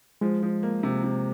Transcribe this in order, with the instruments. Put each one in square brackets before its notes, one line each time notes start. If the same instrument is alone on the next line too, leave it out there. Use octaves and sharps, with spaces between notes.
[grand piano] F3 [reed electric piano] G#3
[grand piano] F3
A#3
C3
C3